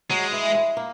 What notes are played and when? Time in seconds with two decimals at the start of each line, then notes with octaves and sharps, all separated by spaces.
0.10 F#3 G#3
0.32 E3
0.54 G#3
0.77 A#3